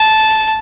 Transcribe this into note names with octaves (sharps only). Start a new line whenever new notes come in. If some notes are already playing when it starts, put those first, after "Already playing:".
Already playing: A5